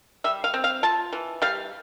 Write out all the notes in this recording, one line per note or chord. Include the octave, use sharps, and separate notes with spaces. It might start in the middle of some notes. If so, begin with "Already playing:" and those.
G3 E5
F5
C4
F5
F4 A5
E3
G3 F5